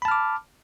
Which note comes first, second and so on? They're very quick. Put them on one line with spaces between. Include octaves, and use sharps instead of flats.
B5 A5 F6 D6